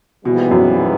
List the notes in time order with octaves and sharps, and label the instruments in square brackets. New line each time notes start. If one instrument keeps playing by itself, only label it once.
[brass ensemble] A#1 G#2 E3 G3 B3 [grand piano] B2
[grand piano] F#2